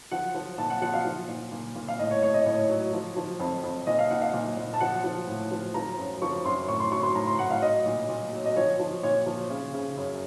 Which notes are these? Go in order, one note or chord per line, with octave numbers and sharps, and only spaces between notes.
F3 F#5
F3
A#2 A5
F#5
F3 F#5
F5
F3
A#2
A#2
A#2
F5
A2 D#5
C#5
A2 C#5
D#5
A2 C#5
F#3
F3
F3
F2
F2
A#2 D#5
F5
A#2 F#5
F5
A#2
A#2
A5
F3 F#5
F3
A2
F3
F3 A#5
F#2
F3 C#6
F#2 C6
A2 C#6
C6
F#3 C#6
C6
A2 A#5
C6
A2 F#5
F5
F#3 D#5
A#2
A#2
F#3
D#5
F3 C#5
F3
A#2 C#5
F3
C#3
C#3
F#2